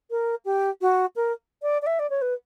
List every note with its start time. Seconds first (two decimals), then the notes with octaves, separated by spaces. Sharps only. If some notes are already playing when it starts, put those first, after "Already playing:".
0.10 A#4
0.45 G4
0.81 F#4
1.16 A#4
1.62 D5
1.82 D5
1.86 E5
1.99 D5
2.10 C#5
2.21 B4